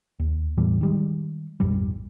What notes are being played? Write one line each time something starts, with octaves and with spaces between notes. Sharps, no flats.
D#2
E2 A2 E3 G3
D#3 G3 G#3
A#1 F2 G#2 G3